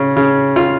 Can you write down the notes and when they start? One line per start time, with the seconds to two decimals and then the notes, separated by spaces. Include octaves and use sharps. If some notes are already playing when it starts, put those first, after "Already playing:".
Already playing: C#3
0.17 C#3
0.56 F4